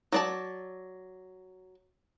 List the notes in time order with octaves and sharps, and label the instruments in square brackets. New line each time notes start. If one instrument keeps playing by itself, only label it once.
[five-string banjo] F#3 D5 A5